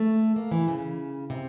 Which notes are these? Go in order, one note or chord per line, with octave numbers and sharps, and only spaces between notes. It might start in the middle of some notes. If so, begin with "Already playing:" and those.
Already playing: A3
A#3
E3
C#3
C3